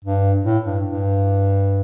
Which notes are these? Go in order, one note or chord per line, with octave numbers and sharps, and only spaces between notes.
G2
A2
G2
G2